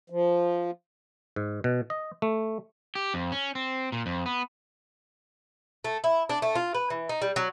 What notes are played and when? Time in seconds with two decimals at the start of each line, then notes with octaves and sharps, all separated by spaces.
0.10 F3
1.36 G#2
1.64 B2
1.90 D#5
2.22 A3
2.95 G4
3.14 F2
3.32 C#4
3.55 C4
3.92 A#2
4.06 F2
4.26 B3
5.84 A3
6.04 E4
6.29 D4
6.42 A3
6.55 F4
6.75 B4
6.90 E3
7.09 D#4
7.22 G3
7.36 F#3